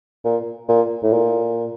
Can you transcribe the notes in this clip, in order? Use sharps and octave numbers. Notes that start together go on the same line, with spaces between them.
A#2
A#2
A2
A#2